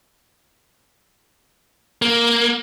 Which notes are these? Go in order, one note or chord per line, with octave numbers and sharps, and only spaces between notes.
A#3